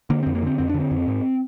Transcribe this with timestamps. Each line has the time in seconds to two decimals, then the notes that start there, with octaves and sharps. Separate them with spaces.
0.10 D3 A#3
0.23 C4
0.27 F2
0.35 A#3
0.43 D3 C4
0.58 F2 C4
0.69 D4
0.74 D3
0.80 C4
0.91 F2
1.08 G#2